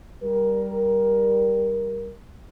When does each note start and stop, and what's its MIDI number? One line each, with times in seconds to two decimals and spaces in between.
0.22 2.11 55
0.22 2.11 70